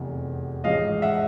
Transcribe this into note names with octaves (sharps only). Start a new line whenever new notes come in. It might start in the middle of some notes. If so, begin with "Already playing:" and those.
Already playing: F1 E2 C3
A1 G#2 F3 G#3 D#5 F5
E5 F#5